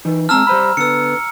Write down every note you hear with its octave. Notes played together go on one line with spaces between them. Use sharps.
E3 D#4
G#3 C4 A5 A#5 E6 F6
G3 C5 B5
D3 B3 E6 C#7